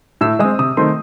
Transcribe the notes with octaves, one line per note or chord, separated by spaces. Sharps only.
A2 E6
G#3 C4 D#6
C3 D#6
D#3 A3 C4 C6